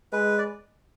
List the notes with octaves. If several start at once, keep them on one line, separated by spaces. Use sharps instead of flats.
G#3 B4
D5